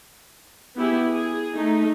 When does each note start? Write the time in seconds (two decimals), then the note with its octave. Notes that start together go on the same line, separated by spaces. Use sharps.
0.77 B3 E4 G4 G#4
1.08 G#4
1.55 A3 D#4